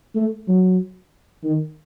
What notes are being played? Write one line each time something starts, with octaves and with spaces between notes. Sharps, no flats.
A3
F#3
D#3